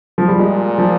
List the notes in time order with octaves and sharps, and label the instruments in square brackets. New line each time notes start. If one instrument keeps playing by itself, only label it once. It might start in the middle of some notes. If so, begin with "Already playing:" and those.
[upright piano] F3
G3
[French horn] A#2 [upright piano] G#3
[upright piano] F3